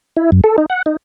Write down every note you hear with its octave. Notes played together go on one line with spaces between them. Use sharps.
E4
F#2
A4
D#4
F#5
D#4